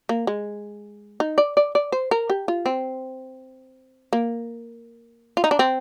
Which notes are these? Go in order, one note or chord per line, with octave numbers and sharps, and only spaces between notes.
A#3
G#3
D#4
D5
D5
D5
C5
A#4
G4
F4
C4
A#3
F4
D#4
D4
C4